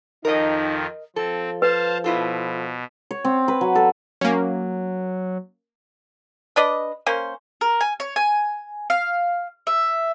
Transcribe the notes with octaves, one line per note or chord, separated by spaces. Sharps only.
F2 D#3 F3 D#4 A#4 D#5
F3 C4 A4
B4 C5 F5 A5
B2 E4 F4 A4
C#5
C4
B4
F#3
A4
F#3 A#3 C#4
D4 B4 D5 D#5
A#3 C#4 C5
A#4
G#5
C#5
G#5
F5
E5